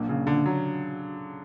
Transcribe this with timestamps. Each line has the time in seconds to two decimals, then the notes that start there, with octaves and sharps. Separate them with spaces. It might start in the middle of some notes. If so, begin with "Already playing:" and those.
Already playing: A#2 F#3 A#3 D4
0.09 C#3
0.27 D3
0.46 F#3